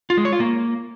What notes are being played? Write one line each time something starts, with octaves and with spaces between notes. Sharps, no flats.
F4
G#3
C#5
F4
A#3